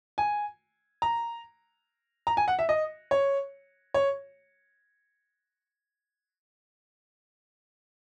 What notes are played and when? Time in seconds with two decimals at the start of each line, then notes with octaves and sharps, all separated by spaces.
0.18 G#5
1.02 A#5
2.27 A#5
2.37 G#5
2.48 F#5
2.59 E5
2.69 D#5
3.11 C#5
3.94 C#5